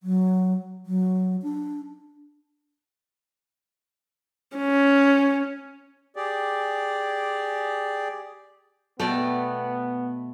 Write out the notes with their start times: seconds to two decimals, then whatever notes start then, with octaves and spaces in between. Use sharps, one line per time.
0.03 F#3
0.86 F#3
1.42 D4
4.57 C#4
6.16 G4 G#4 D5
9.00 B2 A3 B3 D5 G5